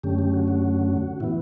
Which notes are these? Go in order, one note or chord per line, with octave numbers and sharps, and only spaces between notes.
F#2 D3 A3 C#4 G4
G4
F#4
F#4
A2 E3 B3 E4